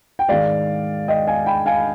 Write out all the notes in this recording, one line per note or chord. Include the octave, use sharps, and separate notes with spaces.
G5
G#2 D#3 G#3 D5 F5
D#5 G5
F5 G#5
G5 B5
F5 G#5